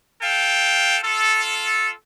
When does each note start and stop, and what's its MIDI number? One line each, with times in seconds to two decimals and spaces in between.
0.21 0.97 69
0.21 0.97 77
0.21 0.97 79
1.04 1.91 65
1.04 1.91 69